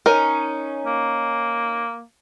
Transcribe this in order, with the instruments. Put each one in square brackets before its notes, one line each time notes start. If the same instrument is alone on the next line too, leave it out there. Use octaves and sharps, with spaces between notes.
[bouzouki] C#4 D#4 [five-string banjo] A#4
[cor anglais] A#3